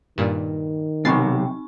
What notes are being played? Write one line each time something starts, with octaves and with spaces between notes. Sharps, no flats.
G2 A#2 D#3
B1 A2 C3 C4 D#4 C#6 A6 C7